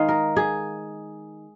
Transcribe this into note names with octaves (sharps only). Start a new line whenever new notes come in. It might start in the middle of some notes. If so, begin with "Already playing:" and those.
Already playing: D#3 G#3 D#4 D#5 F5
A#4
G#4